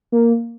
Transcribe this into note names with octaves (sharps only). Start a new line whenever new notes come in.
A#3